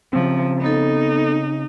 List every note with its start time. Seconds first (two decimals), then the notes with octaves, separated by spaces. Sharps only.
0.13 C#3 F3 C4
0.62 B3 D#4 A4